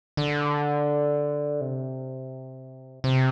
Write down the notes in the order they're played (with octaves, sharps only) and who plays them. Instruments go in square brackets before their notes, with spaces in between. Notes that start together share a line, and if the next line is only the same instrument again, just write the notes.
[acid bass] D3
C3
C3